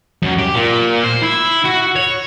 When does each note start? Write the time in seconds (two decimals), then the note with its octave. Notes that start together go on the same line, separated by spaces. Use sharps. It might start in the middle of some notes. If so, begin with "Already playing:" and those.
0.22 F#2
0.39 G4
0.55 A#2
1.03 C5
1.23 E4
1.64 F#4
1.96 C#5